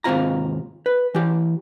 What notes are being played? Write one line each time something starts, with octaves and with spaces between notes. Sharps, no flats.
D#2 G#2 C3 C4 F4 A#5
B4
E3 G4